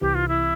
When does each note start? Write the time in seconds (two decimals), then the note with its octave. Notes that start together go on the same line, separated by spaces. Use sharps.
0.01 C2 C3 E3 G4
0.14 F4
0.28 E4